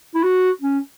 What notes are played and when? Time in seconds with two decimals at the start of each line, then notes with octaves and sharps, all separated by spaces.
0.15 E4
0.23 F#4
0.61 C#4